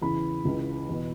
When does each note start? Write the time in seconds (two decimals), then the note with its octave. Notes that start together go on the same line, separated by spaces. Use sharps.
0.01 E2 C#3 E3 B5
0.45 C#2 C#3 E3
0.89 E2 B2